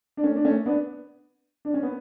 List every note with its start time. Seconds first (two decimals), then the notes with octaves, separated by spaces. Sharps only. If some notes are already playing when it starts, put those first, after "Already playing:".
0.17 D4
0.24 A3 C#4
0.36 D4
0.45 A3 C#4
0.66 B3 D4
1.65 D4
1.74 C#4
1.83 B3